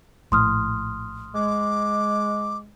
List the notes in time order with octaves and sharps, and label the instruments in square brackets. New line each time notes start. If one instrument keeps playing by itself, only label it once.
[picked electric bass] A#1 A2 [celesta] C6 D#6 F6
[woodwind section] G#3 [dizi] D6